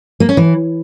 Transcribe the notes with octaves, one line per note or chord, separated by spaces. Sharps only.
A#3
C#4
E3